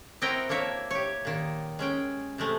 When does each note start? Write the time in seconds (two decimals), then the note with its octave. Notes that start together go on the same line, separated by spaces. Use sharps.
0.22 C4 E4 F#4 A#4 D#5 G5
0.49 A#3 D4 A#4 C#5 E5
0.91 G4 C#5
1.25 A#2 D#3
1.79 G#3 C#4 G5
2.38 C3 G#3 A3